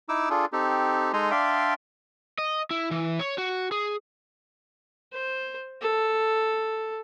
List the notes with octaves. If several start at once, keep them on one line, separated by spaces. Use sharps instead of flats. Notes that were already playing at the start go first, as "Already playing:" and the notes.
D#4 E4 D6 E6
D4 F4 G#4 A4
C4 D#4 G4 A4
G#3 D#4 A4 G#5 A#5 C6
D4 D5 E5 F5 G5 C6
D#5
E4
E3
C#5
F#4
G#4
C5
A4